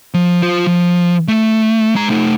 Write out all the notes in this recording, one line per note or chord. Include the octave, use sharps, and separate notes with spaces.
F3
F4 C5
F3
A3
G#3 A#5
A3 D#4